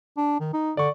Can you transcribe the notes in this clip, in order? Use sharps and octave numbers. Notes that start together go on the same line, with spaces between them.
D4
D#3
D#4
D3 D5 C#6